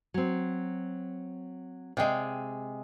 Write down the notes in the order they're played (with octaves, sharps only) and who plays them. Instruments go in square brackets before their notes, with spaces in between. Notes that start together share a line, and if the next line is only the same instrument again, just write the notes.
[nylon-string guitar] F#3 C4
[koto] C3 G#3 [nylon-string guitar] D5 F5 G5